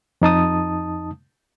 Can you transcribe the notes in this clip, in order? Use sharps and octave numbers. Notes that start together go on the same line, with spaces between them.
F2 D#4 A5 D#6